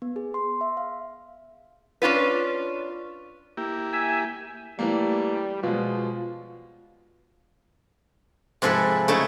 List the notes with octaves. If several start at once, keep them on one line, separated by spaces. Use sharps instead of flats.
B3
G#4
C6
E5
F5
C#4 D4 F4 B4
A#3 E4 G4
E5 G#5 E6
E3 G3 A3 A#3
B2 F3 G#3 F4
G#2 C3 F3 A4 B4
C#3 A3 D#4 E4 A5 A#5